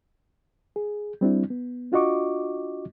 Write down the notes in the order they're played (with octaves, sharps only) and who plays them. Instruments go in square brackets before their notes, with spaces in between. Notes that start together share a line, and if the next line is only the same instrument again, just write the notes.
[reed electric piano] G#4
G3 C4 D4 E4
B3
D4 F4 F#4 D#5 C#6 D6